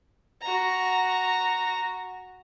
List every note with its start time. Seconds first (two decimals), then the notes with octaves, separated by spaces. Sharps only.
0.42 F#4 A#5